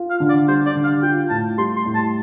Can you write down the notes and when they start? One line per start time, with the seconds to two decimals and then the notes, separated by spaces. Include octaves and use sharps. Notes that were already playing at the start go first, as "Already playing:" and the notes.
Already playing: F4
0.10 F5
0.20 D3
0.29 D5
0.48 G3 C5
0.66 D5
0.75 D3
0.84 F5
1.02 F4 G5
1.30 A2 A5
1.58 G3 C6
1.77 C6
1.85 A2
1.95 A5